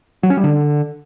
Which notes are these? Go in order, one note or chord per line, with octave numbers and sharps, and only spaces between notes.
F#3
C#4
G3
D3